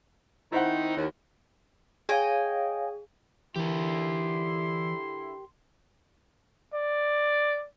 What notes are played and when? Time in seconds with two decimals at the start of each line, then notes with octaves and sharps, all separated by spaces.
0.52 D#3 C4 D#4 E4 C5 F#5
0.97 D#2
2.09 G#4 C#5 D#5 F5 G5 G#5
3.56 D3 E3 E4 G4 A#4 C6
6.74 D5